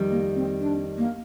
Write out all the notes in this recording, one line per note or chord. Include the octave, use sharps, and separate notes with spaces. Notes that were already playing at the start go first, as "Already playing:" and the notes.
Already playing: F2 D#3 G3
A#3
C4
D4
A#3